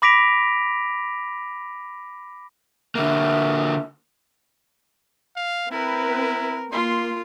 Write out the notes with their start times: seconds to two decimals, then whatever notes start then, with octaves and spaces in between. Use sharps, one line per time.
0.02 B5 D6 A#6 B6 D7 F7
2.95 D3 A#3 E5
5.36 F5
5.72 C4 E4 A#4 B4
6.72 A#3 F4 C6